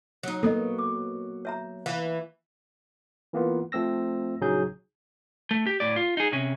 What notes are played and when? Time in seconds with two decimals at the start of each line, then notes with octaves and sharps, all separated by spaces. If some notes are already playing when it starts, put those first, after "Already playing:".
0.23 F#3 D#4
0.43 A#3 B3 A4 D#5
0.79 D6
1.45 C#5 E5 A#5
1.86 E3 F5
3.33 E3 A#3 B3 F4
3.72 F3 A3 C4 E6 A#6
4.41 A#1 C#3 F#3 D#4 G#4 G6
5.51 A3
5.66 G4
5.80 A2 D5
5.96 F4
6.17 D#4 G#4
6.32 C3 C#4